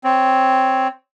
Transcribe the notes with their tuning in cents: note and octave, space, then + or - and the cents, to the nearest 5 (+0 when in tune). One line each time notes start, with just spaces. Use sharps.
C4 +0 C#5 +0